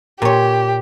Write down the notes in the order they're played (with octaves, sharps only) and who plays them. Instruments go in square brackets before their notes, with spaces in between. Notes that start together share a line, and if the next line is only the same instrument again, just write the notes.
[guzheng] A#2 C#5 [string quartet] G4